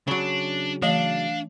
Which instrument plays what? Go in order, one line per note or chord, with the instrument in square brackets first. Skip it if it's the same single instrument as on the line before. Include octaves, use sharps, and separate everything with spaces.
[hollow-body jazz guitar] C#3 F#3 [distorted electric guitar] D4
[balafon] E3 A3 D#5 [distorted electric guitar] D4 [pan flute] F5